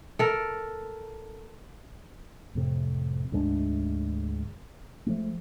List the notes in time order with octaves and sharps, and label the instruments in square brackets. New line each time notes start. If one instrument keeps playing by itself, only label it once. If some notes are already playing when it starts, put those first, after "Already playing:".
[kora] A4 A#4
[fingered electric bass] F2 A2 C3
D2 G#2 G#3 D4
F3 G#3 A3